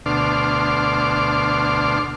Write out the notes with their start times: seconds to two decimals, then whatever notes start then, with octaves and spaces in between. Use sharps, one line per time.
0.06 D2 B2 D4 C6 D6 F6